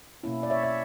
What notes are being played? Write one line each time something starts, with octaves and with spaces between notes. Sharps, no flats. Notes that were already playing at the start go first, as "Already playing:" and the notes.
B2 A#3 C#4 E4
D5
C#5 E5
C#5 E5